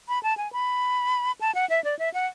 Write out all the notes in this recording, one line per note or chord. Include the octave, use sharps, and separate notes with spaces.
B5
A5
G#5
B5
A5
F#5
E5
D5
E5
F#5